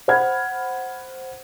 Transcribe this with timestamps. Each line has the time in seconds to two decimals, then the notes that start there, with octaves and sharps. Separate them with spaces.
0.08 C5 F#5 B5 F6 G#6